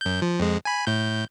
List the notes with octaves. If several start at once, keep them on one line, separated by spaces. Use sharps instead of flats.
F#2 G6
F3
F2 G#3
G#5 B5
A2 G6